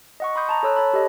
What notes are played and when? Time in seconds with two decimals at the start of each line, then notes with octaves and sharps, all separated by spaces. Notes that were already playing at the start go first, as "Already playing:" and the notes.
0.20 D#5 F#5 C#6
0.36 B5 C6 D#6 G6
0.49 A5 A#5
0.63 A4 C#5 E6 F#6
0.76 C#5 A5 B5
0.94 G4 A4 D#5